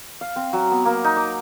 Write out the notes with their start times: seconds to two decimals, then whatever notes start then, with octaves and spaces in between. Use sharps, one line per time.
0.21 F5
0.36 C4
0.53 F#3
0.71 B3
0.85 A#3
1.04 D#4
1.17 D6